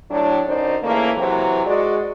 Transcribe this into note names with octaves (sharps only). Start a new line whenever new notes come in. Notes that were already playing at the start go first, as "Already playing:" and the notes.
A2 F#3 D4
F#2 D3 C#4 D#4 C5 D5
C#3 E3 A3 A#3
C3 E3 F#3
G#3 F#4 D5